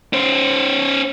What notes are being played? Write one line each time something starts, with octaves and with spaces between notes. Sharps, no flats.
C#4 C5